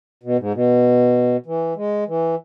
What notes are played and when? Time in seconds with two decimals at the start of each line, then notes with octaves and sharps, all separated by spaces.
0.23 B2
0.39 G#2
0.54 B2
1.46 E3
1.76 G#3
2.08 E3